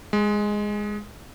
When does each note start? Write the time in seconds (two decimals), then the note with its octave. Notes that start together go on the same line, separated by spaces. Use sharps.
0.13 G#3